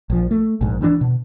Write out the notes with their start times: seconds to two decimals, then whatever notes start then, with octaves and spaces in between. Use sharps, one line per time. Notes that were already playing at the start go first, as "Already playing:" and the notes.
0.10 A#1 F3
0.31 A3
0.61 A#1 G#2
0.81 D#3 E3 C#4 D4
1.01 B2